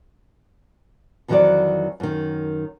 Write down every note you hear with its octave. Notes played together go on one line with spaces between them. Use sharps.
F2 D#3 E3 F#3 F#4 D5
F#2 D#3